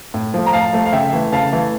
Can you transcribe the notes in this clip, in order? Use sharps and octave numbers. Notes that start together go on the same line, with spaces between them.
A2
F3 A3
A#5
A2 F5 A5
F3 A3
F5
C#3 E5 G5
E3 A3
C#3 F5 A5
E3 A3